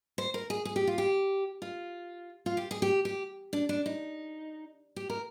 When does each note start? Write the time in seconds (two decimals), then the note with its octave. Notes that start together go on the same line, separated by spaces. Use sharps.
0.18 C5
0.34 A#4
0.50 G#4
0.65 G#4
0.76 G4
0.87 F4
0.98 G4
1.62 F4
2.46 F4
2.57 G4
2.71 G#4
2.82 G4
3.05 G4
3.53 D4
3.69 D4
3.86 D#4
4.96 G4
5.10 A#4